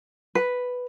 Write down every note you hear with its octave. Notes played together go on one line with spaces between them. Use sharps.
B4